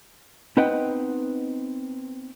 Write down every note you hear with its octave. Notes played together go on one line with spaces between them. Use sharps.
B3 C4 D#4 B4 F#5 G5